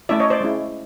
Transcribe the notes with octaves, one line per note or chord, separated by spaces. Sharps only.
A3 C#4 E4 D5 E5
C#5 D#5
C5 D5
G#3 C#4 E4